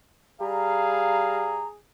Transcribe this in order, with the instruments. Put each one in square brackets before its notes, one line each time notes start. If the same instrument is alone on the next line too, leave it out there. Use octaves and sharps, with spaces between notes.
[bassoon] G3 [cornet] G#4 [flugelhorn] F5 [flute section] A#5